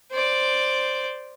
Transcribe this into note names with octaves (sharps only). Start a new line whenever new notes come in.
C5 D5